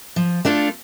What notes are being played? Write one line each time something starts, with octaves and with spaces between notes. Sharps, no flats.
F3
A3 D4 F4 A4